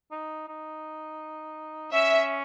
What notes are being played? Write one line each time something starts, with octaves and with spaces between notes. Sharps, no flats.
D#4
D#4
C#4 E5